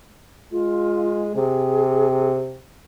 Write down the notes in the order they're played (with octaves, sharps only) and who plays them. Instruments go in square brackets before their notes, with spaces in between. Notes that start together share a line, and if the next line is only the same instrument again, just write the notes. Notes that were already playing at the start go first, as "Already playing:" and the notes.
[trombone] G#3 [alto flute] F4
[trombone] C3 [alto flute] G#4